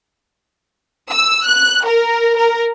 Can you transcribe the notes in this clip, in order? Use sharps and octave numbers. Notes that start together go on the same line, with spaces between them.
E6
F#6
A#4
A#4